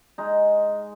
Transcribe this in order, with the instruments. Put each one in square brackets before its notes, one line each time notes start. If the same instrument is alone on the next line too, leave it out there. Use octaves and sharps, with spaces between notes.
[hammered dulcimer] G#3 D#4